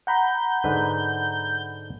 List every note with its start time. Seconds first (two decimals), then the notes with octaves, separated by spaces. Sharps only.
0.07 F#5 A#5 B5 G6
0.64 G#2 D3 B4